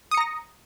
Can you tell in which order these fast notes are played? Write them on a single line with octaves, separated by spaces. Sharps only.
D#6 C#7 A#5 A#6